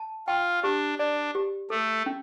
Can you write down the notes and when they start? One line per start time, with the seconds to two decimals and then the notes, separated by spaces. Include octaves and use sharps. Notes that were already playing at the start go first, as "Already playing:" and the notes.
Already playing: A5
0.28 F4 G5
0.63 D4 G4
0.99 D4 D5
1.35 G4
1.70 A3 A4
2.06 C#4